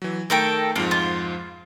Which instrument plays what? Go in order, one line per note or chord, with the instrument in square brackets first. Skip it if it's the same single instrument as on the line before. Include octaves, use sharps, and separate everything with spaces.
[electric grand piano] E3 F#3
[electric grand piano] D#3 A3 [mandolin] A4 A#4 G5
[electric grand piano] F2 G#2 F3 [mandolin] A#3
[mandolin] F4